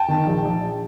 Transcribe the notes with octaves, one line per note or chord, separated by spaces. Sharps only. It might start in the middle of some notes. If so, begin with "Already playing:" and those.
Already playing: G5 A5
D#3
A#1
A#1